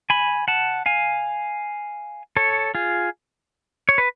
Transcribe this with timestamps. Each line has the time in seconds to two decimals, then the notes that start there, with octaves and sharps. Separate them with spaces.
0.10 G#5 B5
0.48 F#5 A5
0.86 F5 G#5
2.37 A4 C#5
2.75 F4 G#4
3.89 C#5
3.98 B4